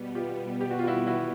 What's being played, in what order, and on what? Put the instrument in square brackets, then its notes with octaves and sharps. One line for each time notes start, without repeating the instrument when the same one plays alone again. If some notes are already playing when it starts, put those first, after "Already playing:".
Already playing: [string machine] B2 G3 B3
[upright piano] F4 G4
G4
F#4
F4
E4 F#4
E4 F#4